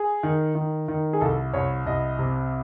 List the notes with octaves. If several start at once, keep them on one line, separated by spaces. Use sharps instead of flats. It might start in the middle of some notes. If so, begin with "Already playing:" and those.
Already playing: G#4
D#3
D#3
D#3
G#4
C2 A4
C2 C#5
C2 D#5
C3